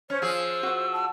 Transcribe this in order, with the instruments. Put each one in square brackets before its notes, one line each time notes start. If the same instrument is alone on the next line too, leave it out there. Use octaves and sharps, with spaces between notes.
[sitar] C#4 [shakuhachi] C5 [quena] C#5
[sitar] F3 G#4 [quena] E6
[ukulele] F#4 F#5
[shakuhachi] A5